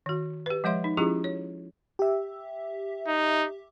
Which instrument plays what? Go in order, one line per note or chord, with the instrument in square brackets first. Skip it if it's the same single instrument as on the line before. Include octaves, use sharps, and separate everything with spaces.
[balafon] D#3 F#4
G4 B4
F3 G#3 C#5 E5 C6
D#4
F3 C#4 E4 F4 G4 G#4
C#5
[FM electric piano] G4 E5
[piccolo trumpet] D#4